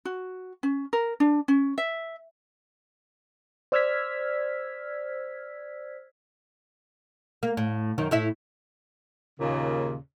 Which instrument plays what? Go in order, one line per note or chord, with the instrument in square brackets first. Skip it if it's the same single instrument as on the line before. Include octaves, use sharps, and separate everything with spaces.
[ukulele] F#4
C#4
A#4
D4
C#4
E5
[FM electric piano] C5 D5 E6 F6 G#6 B6
[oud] A#3
A2
F#2 D#3 D#4
A2 E4 E5
[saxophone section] D#2 A#2 C#3